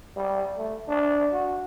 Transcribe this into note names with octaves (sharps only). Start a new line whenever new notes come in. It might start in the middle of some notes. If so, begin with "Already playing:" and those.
G3
A3
D4
F#4